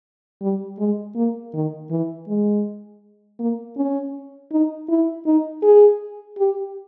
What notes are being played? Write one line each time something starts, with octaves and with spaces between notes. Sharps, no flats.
G3
G#3
A#3
D#3
E3
G#3
A#3
C#4
D#4
E4
D#4
G#4
G4